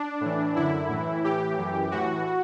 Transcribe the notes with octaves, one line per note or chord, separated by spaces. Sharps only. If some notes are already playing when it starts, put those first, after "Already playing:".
Already playing: D4
A2 E3
F#2 D3 E4
A2 E3
A2 E3 G4
F#2 E3
A2 E3 F#4